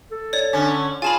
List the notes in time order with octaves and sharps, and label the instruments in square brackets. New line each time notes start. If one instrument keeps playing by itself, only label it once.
[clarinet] A4
[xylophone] C#5 D5
[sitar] D3 C#4
[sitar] F4 [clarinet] G#4 [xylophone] G#5 A5 B5